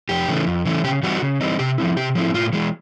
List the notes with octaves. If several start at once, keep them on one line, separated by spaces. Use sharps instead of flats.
F2 G4
C#3 E3 A3
F2
C#3 E3 A3
C#3 G4
E3 G3 C4 D#4 F#4
C#3
E3 G3 C4 D#4
C3 G4
F3 A3 C4 E4
C3 G4
F3 A3 C4 E4
A2 F4
E3 G#3